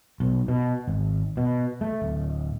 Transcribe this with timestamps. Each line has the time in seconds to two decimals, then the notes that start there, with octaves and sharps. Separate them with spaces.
0.20 B1
0.48 B2
0.88 G#1
1.37 B2
1.81 A3
2.02 D1